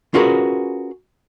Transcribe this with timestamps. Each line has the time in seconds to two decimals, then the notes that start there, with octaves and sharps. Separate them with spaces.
0.14 C#4 F4 F#4 G#4 A#4 B4